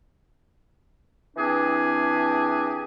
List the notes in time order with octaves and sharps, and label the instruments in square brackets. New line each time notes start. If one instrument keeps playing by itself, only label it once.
[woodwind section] E3 C4 D4 G4 G#4